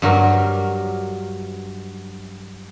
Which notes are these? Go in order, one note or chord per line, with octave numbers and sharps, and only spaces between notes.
G2 F#3 A#4